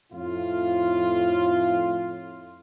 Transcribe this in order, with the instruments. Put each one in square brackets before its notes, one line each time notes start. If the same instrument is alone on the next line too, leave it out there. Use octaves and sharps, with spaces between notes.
[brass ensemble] F2 A2 F4